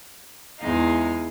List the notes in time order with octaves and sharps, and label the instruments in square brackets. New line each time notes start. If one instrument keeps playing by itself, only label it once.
[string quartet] E2 G#3 D#4 F5